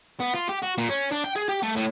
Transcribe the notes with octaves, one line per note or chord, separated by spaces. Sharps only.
B3
F4
G4
F#4
A#2
C#4
D4
G5
G#4
G4
A3
A2